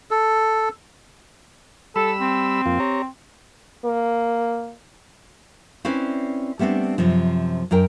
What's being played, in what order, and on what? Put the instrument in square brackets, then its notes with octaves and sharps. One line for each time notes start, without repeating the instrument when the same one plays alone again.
[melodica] A4
[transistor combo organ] G3 B5 E6 [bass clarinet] A4
[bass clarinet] C4
[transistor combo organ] F2 A#3 F4
G4 C#5 A#5
[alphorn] A#3
[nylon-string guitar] C4 C#4 E4 B4 D5
G3 A3 B3 C4 D4
F#2 C3 F3
F#2 D4 A#4 G5